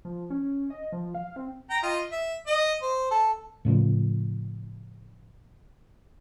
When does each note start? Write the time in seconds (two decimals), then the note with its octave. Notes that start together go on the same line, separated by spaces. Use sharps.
0.05 F3
0.30 C#4
0.70 D#5
0.92 F3
1.15 F5
1.36 C4
1.70 G5 A#5
1.83 F4 D#5
2.12 E5
2.47 D#5
2.82 C5
3.11 A4
3.65 A2 C#3 F3 A3